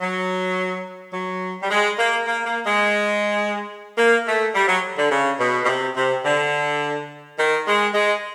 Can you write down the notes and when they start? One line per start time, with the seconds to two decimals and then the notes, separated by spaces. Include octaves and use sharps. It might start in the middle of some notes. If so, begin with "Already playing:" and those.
0.01 F#3
1.13 F#3
1.63 G3
1.70 G#3
1.99 A#3
2.26 A#3
2.46 A#3
2.65 G#3
3.98 A#3
4.26 A3
4.54 G3
4.68 F#3
4.97 D3
5.11 C#3
5.39 B2
5.64 B2
5.68 C3
5.96 C3
6.25 D3
7.38 D#3
7.66 G#3
7.94 G#3